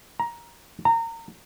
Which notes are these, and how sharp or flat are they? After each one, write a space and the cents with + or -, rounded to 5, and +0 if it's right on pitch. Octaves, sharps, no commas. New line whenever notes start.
A#5 +15
A#5 -25